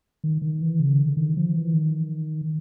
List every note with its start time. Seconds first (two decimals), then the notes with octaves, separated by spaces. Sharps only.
0.24 D#3
0.42 D#3
0.61 E3
0.80 C#3
0.99 D3
1.17 D#3
1.37 F3
1.56 E3
1.74 D#3